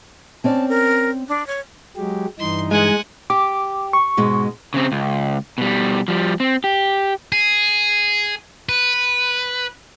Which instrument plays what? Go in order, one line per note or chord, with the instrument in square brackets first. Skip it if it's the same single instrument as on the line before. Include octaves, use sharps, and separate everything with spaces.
[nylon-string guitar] C4 C#4 D5 [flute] A5
[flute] A#4
D4
C#5
[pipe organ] F#3 G#3 G4
[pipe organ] G2 E3 D#4 [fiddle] C6
[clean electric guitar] G#3 [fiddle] F#5 G#5
[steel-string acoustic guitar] G4 [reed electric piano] D6
[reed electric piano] C#6
[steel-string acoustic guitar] G#2 B2 G#3
[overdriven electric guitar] C#3 C4
C#2
B2 G3
F3 G3
C4
G4
[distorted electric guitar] G#4
B4